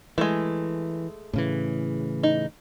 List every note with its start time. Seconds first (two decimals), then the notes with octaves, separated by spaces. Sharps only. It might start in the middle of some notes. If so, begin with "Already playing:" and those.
0.18 E3 G#3 A3
1.33 A2 C#3 E3
2.23 D#4